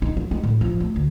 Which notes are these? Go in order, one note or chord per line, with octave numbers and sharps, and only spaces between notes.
D#4
F#3
G#3
A2
F3
A3
D2